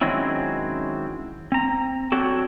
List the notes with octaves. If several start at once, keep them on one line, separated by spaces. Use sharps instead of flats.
D#3 F#3 G#3 C4 C#4 E4
C4 A#5
F#3 C4 D4 F#4 A4